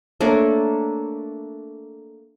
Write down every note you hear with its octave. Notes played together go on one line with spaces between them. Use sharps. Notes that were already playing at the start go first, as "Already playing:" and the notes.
A3 A#3 D4 C#5